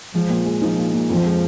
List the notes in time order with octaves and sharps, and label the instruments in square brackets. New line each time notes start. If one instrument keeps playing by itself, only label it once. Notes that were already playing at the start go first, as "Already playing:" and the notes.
[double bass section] F3 [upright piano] G#3
[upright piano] A#2
G#3
[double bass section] F3 [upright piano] D#4
[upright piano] A#2
A#2
[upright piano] F2 [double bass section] F3
[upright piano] G#3